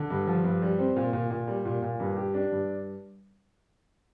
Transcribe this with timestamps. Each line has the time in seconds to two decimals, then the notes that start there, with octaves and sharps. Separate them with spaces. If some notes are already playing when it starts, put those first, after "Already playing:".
Already playing: D3
0.10 G2
0.27 F3
0.44 G2
0.62 G3
0.79 C4
0.96 A#2
1.13 A#2
1.30 A#2
1.48 G3
1.65 A#2
1.82 A#2
2.00 G2
2.17 G4
2.34 D4
2.51 G2